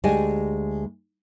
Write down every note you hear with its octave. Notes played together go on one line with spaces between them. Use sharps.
D2 G#3 G4 D5 D#5 G#5